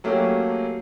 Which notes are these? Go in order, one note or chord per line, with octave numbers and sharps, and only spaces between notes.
F#3 A3 A#3 C#4 F#4 G4